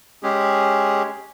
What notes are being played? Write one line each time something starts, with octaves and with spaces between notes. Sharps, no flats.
G#3 C#4 G4 G#4